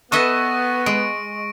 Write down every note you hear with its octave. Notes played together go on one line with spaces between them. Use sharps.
B3 A4 D#5 E5 C#6 A#6
G#3 D7